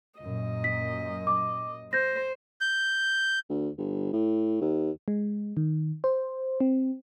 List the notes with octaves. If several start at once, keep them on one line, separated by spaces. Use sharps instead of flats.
F#2 A#2 D#5
B6
D6
C5 G6 A#6
G6
D2
G1
A2
D#2
G#3
D#3
C5
C4